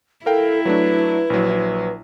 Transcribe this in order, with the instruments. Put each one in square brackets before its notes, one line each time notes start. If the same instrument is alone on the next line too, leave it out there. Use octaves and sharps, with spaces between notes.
[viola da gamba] E4 [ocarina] A4 [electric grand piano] A#4 F5 G5
[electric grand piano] F#3 A3 D4 [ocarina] B4
[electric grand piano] A#1 F#3